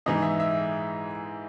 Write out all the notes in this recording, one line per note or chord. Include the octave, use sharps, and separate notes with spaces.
G#2 E3 G#3 D#5
E5
E5